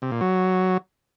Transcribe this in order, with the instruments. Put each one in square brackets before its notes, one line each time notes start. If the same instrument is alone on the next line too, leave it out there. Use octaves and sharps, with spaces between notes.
[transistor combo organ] C3
A#2
F#3